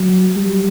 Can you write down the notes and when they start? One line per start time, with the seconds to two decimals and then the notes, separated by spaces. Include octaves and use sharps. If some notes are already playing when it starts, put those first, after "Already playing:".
Already playing: F#3
0.36 G3